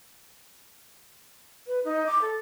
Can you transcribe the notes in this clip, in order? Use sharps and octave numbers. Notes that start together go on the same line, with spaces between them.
B4
D#4
D6
A4